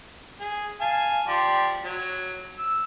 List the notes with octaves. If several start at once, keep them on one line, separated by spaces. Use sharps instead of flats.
G#4
F5 G#5 A5
F3 G4 D5
F#3
E6